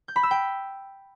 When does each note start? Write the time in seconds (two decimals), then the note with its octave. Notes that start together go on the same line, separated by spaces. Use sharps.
0.08 G6
0.16 B5
0.23 E6
0.31 G5